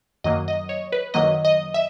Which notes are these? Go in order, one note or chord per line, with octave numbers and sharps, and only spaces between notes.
F#2 D#3 F#3 A#3 D#5
D#5
C#5
B4
F#2 D#3 F#3 A#3 D#5
D#5
E5